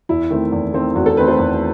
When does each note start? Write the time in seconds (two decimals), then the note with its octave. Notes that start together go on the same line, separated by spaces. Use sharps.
0.09 E2 E4
0.30 D#3 A3 C4
0.52 E2
0.74 D#3 A3 C4
0.95 E2 F#4
1.06 A4
1.17 D#3 A3 C4 B4
1.28 C5
1.39 E2